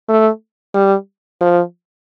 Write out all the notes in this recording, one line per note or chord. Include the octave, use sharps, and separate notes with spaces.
A3
G3
F3